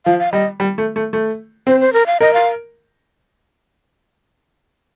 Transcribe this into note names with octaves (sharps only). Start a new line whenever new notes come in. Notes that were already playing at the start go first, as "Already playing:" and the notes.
F3 F5
F5
G3 D#5
G3
A3
A3
A3
C4 C5
C5
A#4
F5
A#4 D#5
F5